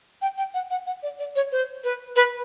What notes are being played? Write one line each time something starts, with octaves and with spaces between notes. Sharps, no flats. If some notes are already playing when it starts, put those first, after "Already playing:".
G5
G5
F#5
F#5
F#5
D5
D5
C#5
C5
B4
B4